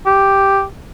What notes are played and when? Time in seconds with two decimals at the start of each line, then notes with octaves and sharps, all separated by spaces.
0.06 G4